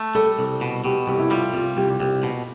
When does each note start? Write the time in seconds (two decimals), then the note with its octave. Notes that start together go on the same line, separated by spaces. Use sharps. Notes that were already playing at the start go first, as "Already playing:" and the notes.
Already playing: A3
0.15 G3 A4
0.39 C2
0.61 B2
0.84 B2 G4
1.07 C2 G4
1.19 E4
1.30 G3 F4
1.54 C2 F4
1.77 C2 G4
2.00 C2 G4
2.23 B2